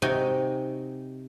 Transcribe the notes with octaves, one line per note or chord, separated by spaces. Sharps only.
C3 D#4 F#4 G5 G#5